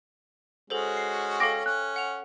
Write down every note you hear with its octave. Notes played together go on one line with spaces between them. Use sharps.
G#3 C#4 F#4 G#4 A4 C5
C7
A4 F5 G5 D6 A#6
C#4 F#6
F#5 F7